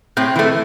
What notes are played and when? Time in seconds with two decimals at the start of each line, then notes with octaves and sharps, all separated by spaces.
0.17 A2 C4
0.36 E3 A3